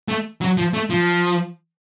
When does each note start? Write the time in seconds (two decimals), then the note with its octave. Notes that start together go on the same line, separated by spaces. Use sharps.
0.08 A3
0.41 F#3
0.57 F3
0.73 A3
0.90 F3